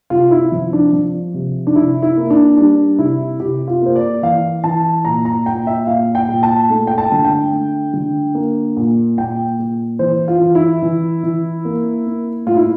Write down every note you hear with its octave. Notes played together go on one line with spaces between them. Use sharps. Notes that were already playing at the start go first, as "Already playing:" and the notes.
C3 F4
E4
F3
D4
F3
C3
D4
C3 E4
E4
A#3
D4
G3 D4
C3 E4
C3 G4
F4
A#3 C5
D5
E3 F5
E3 A5
A#2 A#5
A#5
A#2 G5
E5
A#2 F5
G5
A#2
A5
A3
G5
A5
D3
G5
A3
D3
A#3
A#2
A#2 G5
A#2
E3 C5
F4
E3
E4
E3
E3
A#3
A#3
A2 F4
E4